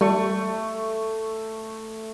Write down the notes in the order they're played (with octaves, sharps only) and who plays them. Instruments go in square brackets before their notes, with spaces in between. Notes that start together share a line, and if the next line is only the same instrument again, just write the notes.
[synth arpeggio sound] G3 [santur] A3 C#6